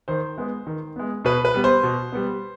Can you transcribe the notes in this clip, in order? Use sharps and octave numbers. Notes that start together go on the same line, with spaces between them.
D#3 C5
G#3 B3
D#3
G#3 B3
B2 B4
B4
G3 B3
C5
B2
G3 B3